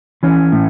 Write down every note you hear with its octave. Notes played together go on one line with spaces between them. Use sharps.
E3 C#4
A2